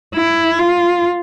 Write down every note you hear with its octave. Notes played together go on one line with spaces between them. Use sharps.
E4
F4